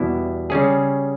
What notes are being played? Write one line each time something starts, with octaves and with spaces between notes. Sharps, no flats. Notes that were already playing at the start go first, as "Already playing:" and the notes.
Already playing: E2 B2 G3 B3 E4
C#3 G3 C#4 G#4